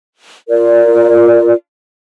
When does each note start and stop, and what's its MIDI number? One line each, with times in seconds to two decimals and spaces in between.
0.49 1.53 65
0.49 1.53 70
0.49 1.53 74